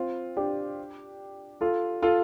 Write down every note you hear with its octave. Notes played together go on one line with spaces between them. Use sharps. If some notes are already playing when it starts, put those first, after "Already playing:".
Already playing: C4 F4
D4 G4
F4 A4
F4 A4